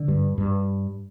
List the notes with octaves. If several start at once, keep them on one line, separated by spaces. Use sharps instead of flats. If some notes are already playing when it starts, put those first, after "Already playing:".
Already playing: D3
G2
G2